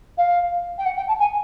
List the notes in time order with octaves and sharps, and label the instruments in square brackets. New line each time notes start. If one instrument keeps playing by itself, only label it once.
[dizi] F5
G5
F#5
G5
A5
G#5